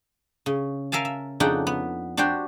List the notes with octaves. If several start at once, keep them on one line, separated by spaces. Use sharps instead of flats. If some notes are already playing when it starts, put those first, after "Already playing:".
C#3
A#4 E5 F5 G#5 A5
E5
F2 C#3 D4 D#4 F#5 G5
B3
D4 F#4 G4 C5 G5